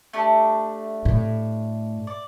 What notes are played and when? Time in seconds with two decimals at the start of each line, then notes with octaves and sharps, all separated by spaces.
0.13 A3 D4 G4
1.05 A2
2.07 D5